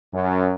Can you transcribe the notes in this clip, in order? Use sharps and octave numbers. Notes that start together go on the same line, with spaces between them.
F#2